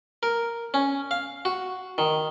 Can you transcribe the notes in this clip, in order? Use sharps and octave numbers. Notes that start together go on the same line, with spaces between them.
A#4
C#4
F5
F#4
D#3